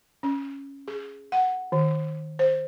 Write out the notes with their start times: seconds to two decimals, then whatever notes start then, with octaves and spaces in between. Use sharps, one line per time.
0.23 C#4
0.88 G#4
1.32 F#5
1.72 D#3
2.39 C5